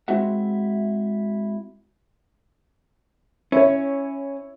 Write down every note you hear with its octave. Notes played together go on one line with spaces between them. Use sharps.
G#3 C4 E4 F#4 E5 F#5
C#4 E4 C#5